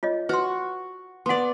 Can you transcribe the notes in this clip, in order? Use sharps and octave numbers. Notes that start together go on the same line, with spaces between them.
F4 C#5 D#5
F#4 B4 C6
B3 D5 F#5 C6